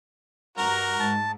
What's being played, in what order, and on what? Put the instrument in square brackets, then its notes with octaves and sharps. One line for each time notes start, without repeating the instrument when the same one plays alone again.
[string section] G2 A#5 [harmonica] F#4 A#4
[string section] G#2 [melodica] A5